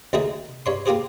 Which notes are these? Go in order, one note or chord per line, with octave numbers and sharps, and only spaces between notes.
D2 D#3 F#3 A3 G#4 E5
G2 C#5 C6
A#3 F4 G4 G#4 C5